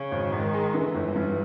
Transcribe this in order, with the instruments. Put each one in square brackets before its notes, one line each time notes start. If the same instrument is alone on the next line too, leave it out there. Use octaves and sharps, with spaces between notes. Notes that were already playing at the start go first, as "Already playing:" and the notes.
Already playing: [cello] C#3
[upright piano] G#1
[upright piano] G#2 [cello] D#3
[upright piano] G#3
[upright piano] D3 [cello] E3
[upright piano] G1
G2